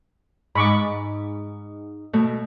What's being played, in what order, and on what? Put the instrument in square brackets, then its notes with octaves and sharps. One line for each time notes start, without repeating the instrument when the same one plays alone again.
[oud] G#2 [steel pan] B5 C#6 D6
[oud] B2 [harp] A3